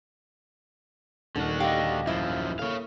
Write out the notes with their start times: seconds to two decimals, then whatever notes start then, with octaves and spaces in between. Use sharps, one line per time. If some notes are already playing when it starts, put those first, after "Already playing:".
1.36 D#1 D3 D#3 F#4 A4 F6
1.60 G4 D#5 F5
2.07 F#2 F3 E4
2.59 A#3 A4 C#5 F5